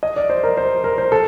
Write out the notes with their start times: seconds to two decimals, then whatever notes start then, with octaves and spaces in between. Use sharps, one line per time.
0.03 D#5
0.16 D5
0.30 C5
0.43 A#4
0.57 C5
0.84 A#4
0.98 C5
1.12 A4